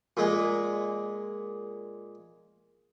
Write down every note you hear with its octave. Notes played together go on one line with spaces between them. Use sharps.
A#2 G#3